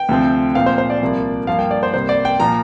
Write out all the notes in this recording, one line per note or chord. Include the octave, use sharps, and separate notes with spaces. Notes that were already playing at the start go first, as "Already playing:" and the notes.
Already playing: G5
D2 C3 F3 C4
A#2 F3 C4 F5
C5
C5
D5
C2 C3 F3 A#3
G2 F3 A#3 F5
G5
D5
C5
C2 C3 A#3 C5
D5
G5
A#2 F3 A#5